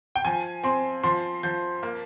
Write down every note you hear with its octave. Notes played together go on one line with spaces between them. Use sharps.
G5
F3 G#5
C4 C6
F3 C6
F3 G6
A#3